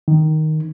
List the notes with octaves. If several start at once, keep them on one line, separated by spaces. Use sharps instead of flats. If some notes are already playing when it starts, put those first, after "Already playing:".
D#3